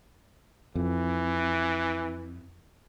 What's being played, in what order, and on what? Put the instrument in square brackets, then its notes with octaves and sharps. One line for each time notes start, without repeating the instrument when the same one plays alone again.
[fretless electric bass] F2 [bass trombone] E3